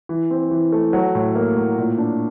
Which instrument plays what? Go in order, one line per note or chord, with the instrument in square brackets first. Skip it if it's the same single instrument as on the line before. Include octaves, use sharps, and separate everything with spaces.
[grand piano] E3
C4
E3
A3
F#3
A2
A#3
A2
A#2
D4